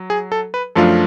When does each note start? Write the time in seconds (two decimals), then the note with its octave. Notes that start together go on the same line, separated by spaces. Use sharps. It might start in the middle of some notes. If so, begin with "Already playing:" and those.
Already playing: F#3
0.10 G#4
0.32 A4
0.54 B4
0.75 F#2 F3 A3 D4 F4 A4